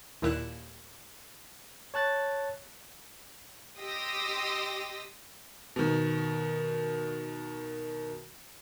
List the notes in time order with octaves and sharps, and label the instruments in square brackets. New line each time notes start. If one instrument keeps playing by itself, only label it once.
[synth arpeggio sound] D#2 A#2 E4 F#6 E7
[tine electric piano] C#5 A5 F#6 A6
[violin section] G4 D#5 C6 D#6 E6 A#6
[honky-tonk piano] B2 D#3